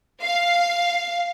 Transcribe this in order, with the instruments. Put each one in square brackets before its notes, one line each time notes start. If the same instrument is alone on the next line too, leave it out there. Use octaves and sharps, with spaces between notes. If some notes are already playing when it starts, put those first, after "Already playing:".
[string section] F5